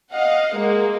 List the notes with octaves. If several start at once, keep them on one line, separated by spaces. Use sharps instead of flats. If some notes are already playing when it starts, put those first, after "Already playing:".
D#5 F5 F#5
G#3 A#3